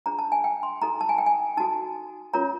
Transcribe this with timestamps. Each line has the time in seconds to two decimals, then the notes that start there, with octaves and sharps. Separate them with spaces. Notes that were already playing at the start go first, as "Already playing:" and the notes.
0.06 D4 F4 G#4 C5 A#5
0.19 A5
0.32 G#5
0.44 G5
0.63 C6
0.82 D#4 F#4 A4 A#5
1.01 A5
1.09 G#5
1.18 G5
1.26 G#5
1.57 D#4 F#4 A4 A5
2.34 C#4 F4 A#4 C#5 A#5